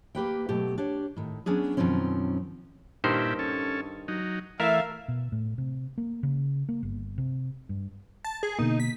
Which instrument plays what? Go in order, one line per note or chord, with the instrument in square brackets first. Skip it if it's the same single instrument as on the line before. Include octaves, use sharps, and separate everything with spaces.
[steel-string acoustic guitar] A#3 G4 B4 G5
B2 F#3 A3 G4
D4 G4 C#5
A2 D#3
F#3 B3 C#4 D4 G#4
F#2 B2 D#3 F3 C4 C#4
[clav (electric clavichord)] G2 D#3 C5 [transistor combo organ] A#2 E4 G4
[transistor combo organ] C#4 A4
F#3 D#4
[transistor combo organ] E3 A3 [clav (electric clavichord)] A#4 [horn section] E5 F5
[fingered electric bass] B2
A2
C3
A#3
C#3
A#3
G1
C3
G2
[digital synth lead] A5
G#4
[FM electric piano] B2 D3 A#3 [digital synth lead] D#4
[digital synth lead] B6